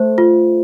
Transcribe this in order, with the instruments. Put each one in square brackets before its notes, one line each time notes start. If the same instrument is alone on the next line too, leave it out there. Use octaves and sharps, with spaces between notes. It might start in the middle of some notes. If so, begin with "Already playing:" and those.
Already playing: [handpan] A3 [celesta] C5
[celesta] F4